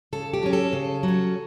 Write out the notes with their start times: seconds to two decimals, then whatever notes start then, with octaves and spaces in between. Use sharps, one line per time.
0.13 C#3 A4
0.34 G4
0.43 F#3 C#4
0.53 A4
0.73 C#3
1.03 F#3
1.08 C#4